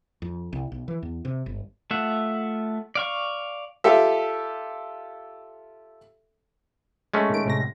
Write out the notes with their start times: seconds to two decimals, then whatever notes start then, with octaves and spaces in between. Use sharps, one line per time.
0.22 F2
0.53 C2
0.72 B1
0.88 E3
1.03 E2
1.25 C3
1.46 G1
1.91 A3 F4 E5 F#5
2.95 D5 F5 C#6
3.84 F4 G4 A4 E5
7.14 G#3 A3 C#4
7.30 A#2 D#3 D7
7.46 A2 C3 A#6